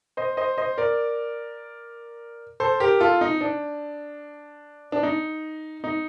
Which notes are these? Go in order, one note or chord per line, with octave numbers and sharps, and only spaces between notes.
C5 D#5
C5 D#5
C5 D#5
A#4 D5
A4 C5
G4 A#4
F4 A4
D#4
D4
D4
D#4
D#4